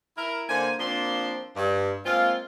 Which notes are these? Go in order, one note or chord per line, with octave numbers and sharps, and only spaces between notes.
E4 A#4
D3 A#3 C5 G#5
F3 A#3 C4 D4 C6
G2
G#3 A#3 C4 F4